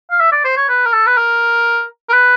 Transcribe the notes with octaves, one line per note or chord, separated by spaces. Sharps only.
F5
E5
D5
C5
C#5
B4
A#4
A4
B4
A#4
A#4
B4